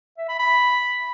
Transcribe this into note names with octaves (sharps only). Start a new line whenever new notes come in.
E5
B5
B5